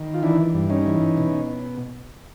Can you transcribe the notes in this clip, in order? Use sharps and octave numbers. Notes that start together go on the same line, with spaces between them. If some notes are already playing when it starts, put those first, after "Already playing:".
Already playing: D#3
F4
E3 D4 E4
G2
C#4 D#4
E3
B2